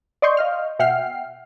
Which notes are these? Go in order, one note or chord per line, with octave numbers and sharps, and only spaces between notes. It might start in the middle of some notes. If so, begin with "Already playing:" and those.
D5 D#5 C6 C#6 G6
D#5 F5 F6
B2 E5 F#5 G5 F6 C7